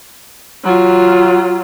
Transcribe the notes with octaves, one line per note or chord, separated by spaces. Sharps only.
F#3 F4